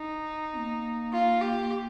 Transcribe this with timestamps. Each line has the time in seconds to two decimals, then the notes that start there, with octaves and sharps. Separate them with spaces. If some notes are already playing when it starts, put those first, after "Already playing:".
Already playing: D#4
0.53 C4
0.57 A#3
1.12 F4
1.41 G4